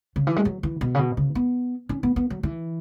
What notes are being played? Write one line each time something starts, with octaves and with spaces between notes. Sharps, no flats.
C#3
E3
G#3
F#3
E3
B2
C#3
B2
C#3
B3
C#4
B3
B3
F#3
E3